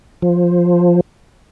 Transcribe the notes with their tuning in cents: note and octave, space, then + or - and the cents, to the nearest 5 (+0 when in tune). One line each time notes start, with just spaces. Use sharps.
F3 +5